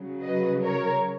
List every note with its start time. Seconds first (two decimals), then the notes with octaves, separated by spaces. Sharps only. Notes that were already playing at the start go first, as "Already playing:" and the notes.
Already playing: C#3 F#3
0.23 B4 D#5
0.63 A#4 C#5